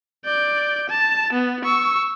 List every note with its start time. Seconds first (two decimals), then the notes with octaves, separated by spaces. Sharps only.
0.25 D5 G6
0.89 A5
1.33 B3
1.65 C#6 E6